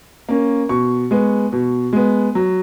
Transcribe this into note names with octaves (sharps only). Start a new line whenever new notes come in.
A#3 C#4
B2 C#6
G#3 B3
B2
G#3 B3
F#3